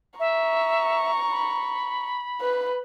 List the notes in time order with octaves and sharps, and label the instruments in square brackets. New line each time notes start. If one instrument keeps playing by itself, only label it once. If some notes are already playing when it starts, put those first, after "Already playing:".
[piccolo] E5 [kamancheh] A#5 C#6
[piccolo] B5
[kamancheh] B4